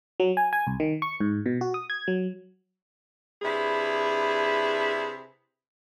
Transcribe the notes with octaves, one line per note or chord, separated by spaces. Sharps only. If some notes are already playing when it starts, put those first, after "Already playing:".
F#3
G#5
G#5
C2
D#3
C#6
G#2
B2
F#4
D#6
G#6
F#3
C3 D4 E4 G#4 B4 B5